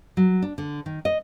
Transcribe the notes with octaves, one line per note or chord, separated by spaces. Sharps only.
F#3
D4
D3
D#3
D#5